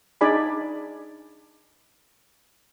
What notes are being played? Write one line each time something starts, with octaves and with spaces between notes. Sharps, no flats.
D4 D#4 G#4 D5 G#5 B5